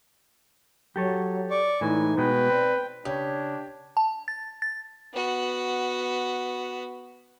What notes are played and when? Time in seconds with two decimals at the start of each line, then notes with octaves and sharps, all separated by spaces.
0.96 F#3 G4 A4 C#5
1.50 D5 C#6
1.81 A2 E3 G#3 D#4 G#5
2.18 B2 G#3 B4 G5
2.50 C4 D5
3.05 C#3 D4 G4 C#5
3.97 A5
4.28 A6
4.62 A6
5.13 B3 F#4